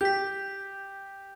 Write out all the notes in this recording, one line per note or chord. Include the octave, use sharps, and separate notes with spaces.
G4 G6 B6